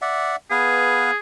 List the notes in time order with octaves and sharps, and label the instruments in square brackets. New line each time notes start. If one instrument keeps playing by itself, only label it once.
[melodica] D5 E5 F#5
[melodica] B3 B4 F5 [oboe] G#4